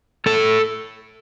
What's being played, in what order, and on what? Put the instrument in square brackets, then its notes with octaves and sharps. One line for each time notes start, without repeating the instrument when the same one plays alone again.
[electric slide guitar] A2 A4